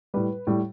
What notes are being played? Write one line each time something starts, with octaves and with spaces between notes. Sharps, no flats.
A2 G3 B4
A2 G3